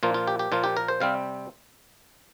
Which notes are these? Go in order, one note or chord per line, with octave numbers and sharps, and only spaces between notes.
A#2 F3 A#3 F4
F4
G4
G4
A#2 F3 A#3 F4
G4
A#4
C5
C3 G3 C4 F5